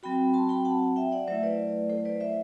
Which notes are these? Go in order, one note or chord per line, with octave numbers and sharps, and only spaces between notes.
F#3 C4 F#4 G5 B5
A5 C6
G5 B5
F#5 A5
E5 G5
D5 F#5
F#3 A3 E4 C5 E5
B4 D5
A4 C5
B4 D5
C5 E5